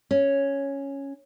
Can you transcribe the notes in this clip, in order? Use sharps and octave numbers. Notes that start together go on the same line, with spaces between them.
C#4